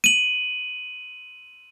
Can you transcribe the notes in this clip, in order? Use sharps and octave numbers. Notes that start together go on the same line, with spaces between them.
D#7 F#7